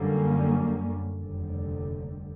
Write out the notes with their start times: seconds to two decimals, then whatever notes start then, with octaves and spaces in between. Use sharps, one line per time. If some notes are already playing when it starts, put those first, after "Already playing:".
Already playing: F#2 D3 G3 A#3 C#4
1.18 F1 D#2 D3 G3